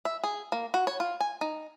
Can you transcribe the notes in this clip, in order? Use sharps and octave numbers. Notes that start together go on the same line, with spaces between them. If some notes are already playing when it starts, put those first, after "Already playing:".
E5
G#4
A#3
F#4
C#5
F4
G#5
D#4